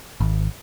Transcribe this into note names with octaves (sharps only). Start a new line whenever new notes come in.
G#1